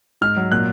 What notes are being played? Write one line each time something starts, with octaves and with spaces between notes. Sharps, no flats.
G#2 F6
F#3
A#2 F#6